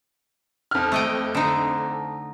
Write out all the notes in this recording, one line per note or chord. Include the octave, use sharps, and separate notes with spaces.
F2 F6
A3 D#5 G5
D3 D#4